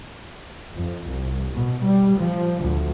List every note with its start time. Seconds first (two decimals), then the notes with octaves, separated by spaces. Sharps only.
0.75 F2
1.06 C2
1.55 B2
1.85 G3
2.19 F3
2.62 D2